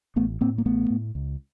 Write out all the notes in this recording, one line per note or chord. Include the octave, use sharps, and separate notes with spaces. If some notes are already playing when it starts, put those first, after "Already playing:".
A1 A3 B3
A2 A#3 C4
A#3
A1 A3 B3
A2
C#2